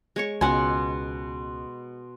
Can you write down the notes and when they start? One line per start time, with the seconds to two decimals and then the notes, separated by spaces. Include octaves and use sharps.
0.16 G#3 C#5 C#6
0.41 C#2 B2 F#5 G#5 C6